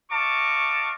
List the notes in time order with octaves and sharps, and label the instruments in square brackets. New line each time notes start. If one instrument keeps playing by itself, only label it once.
[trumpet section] F#4 D#5 F5 A5 C#6 D6